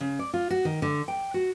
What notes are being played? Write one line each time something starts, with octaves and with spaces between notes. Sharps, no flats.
C#3
D5
F4
F#4
D#3
D3
G5
F#4